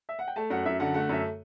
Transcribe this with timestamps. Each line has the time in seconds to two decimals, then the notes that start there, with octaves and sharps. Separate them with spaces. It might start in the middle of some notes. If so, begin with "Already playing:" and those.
0.09 E5
0.19 F#5
0.28 G5
0.36 A3 A5
0.50 F#2 F#5
0.66 F#2 E5
0.80 D3 F#5
0.94 A3 F#5
1.09 F#2 E5